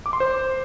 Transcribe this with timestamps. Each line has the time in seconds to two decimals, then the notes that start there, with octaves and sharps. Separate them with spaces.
0.06 D6
0.13 C6
0.20 C5